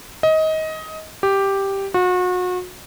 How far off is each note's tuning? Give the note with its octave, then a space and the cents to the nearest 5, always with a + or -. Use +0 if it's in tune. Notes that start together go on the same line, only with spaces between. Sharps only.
D#5 +20
G4 +0
F#4 -35